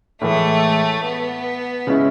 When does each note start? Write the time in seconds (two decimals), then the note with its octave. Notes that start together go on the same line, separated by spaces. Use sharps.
0.21 A2 E3 G#3 A3
1.04 B3
1.87 C#3 G#3 C#4 E4